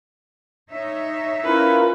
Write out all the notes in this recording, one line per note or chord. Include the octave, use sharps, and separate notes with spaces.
D#4 C#5 E5
C#4 E4 F4 A#4 B4